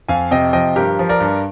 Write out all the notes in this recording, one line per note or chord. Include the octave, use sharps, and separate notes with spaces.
F2 F5 G#5
C3 D#5 G5
F3 D#5 G5
G2 G4 A#4
F3
A#4 D5
G2